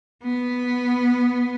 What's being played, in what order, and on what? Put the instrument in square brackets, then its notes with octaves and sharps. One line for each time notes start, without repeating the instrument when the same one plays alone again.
[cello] B3